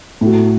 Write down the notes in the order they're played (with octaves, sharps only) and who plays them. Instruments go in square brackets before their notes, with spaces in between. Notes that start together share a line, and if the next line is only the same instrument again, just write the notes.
[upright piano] A2 A3 F#4